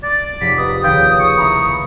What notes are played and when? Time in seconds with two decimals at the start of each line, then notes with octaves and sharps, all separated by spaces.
0.03 D5 A6
0.41 F1 B6
0.57 B3 D#4 D#6
0.84 D#2 C#3 F4 G5
1.19 C#6
1.38 E4 A#5 B5